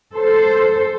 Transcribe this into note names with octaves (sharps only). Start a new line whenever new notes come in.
A4 C5